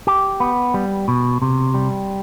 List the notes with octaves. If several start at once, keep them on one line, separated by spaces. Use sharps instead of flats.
G4
B3
G3
B2
C3
G3